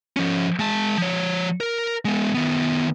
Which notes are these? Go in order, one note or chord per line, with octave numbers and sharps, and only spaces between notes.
F3 C#4
G#3 A5
F3 C#5
A#4
G#3 B3
D#3 B3